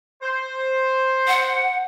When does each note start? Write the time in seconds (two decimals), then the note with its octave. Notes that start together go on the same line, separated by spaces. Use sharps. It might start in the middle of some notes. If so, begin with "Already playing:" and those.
0.22 C5
1.28 F#5